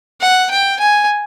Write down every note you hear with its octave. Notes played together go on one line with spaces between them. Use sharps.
F#5
G5
G#5